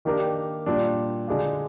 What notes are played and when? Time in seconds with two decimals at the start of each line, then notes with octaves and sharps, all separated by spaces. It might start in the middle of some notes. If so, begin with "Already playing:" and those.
0.05 D#3 A#3 D4 G4 A#4
0.66 A#2 G3 D4
1.28 D3 G#3 D4 F4